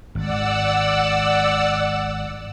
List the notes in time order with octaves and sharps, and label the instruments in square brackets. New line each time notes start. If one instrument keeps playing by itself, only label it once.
[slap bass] G#1 [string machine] D5 F#5 E6